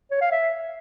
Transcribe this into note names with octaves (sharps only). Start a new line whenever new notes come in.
C#5
F5
E5